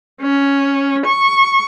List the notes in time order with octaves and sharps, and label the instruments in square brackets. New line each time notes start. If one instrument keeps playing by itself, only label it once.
[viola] C#4
C#6